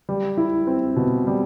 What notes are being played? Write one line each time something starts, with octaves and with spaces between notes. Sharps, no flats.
G3
E4
C4
B2
G3